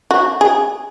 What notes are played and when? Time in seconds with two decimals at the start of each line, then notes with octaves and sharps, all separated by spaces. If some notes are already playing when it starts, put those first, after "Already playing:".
0.11 F#4
0.41 G#4